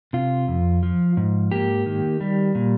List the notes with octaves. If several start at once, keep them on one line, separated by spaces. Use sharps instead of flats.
C3 F4
F2
F3
G#2
A#3 G4
D#3
G3
A#2